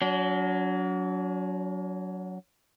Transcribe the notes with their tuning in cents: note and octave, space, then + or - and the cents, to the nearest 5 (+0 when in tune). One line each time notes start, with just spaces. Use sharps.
F#3 +0 D4 -45